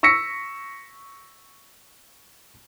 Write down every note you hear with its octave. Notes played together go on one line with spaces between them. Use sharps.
C#6 E6 A#6 B6 C#7